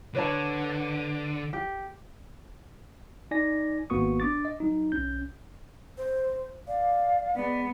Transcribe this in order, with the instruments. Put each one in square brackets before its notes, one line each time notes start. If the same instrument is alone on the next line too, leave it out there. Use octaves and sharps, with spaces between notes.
[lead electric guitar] D3 [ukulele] B4 C#5 A5
[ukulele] G4
[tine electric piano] D#4 D5 G#5 A#6
G#1 A#3 B3 F#4 C#6 D#6
D4 D6 A6
D#5
F#3 D#4
B1 C#4 G6
[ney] C5
[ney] D5 [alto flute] F5
[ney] G#3 [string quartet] B3 [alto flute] D5